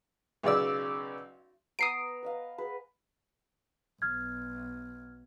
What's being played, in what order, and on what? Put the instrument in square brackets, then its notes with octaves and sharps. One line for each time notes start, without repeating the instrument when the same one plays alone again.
[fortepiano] B1 C#3 D5 E6
[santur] B3 A#5 E6 [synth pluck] D#6 C7 D7
[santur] B4 D#5 F5
G#4 B4
[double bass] B1 [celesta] F6 G#6